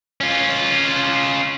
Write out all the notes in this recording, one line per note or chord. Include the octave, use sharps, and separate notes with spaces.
C#4 F4